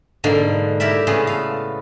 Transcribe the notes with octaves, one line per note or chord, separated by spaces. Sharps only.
G#2 B2 D3 A#3
E4 G4 A#4 D5 E5
A2 C#3 B3 F4 G#4
A4 F5